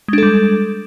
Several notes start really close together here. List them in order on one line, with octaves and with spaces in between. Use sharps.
G#3 D4 A4 G3